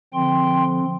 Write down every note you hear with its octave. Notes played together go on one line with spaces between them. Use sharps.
D3 F3 C4 G5 C6